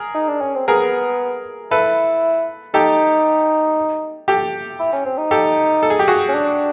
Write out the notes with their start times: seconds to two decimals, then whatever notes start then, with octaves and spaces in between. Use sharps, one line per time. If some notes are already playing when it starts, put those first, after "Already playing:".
Already playing: G#4 A#4
0.15 D#4
0.28 D4
0.41 C#4
0.55 C4
0.68 B3 G#4 A#4
1.71 E4 A4 B4
2.74 D#4 G4 A4
4.28 G4 A4
4.80 E4
4.93 C#4
5.06 C4
5.18 D#4
5.31 G4 A4
5.83 A4
5.90 G#4
5.99 G4
6.08 F#4 G#4
6.29 C#4
6.34 D4